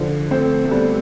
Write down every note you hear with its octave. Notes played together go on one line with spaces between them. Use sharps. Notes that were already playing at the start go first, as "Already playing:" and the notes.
Already playing: D3 F3
A3 C4
A3
G3 B3